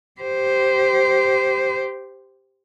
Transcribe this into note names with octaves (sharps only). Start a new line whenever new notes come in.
G4 C5